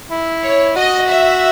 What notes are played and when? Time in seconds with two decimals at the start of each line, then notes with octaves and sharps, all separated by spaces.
0.11 E4
0.43 C#5
0.76 F#4 D#5
1.08 E5